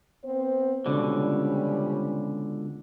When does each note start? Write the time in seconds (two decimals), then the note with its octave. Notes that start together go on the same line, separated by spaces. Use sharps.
0.24 B3 C4 C5
0.86 C#2 B2 D3 F3 G3 C#4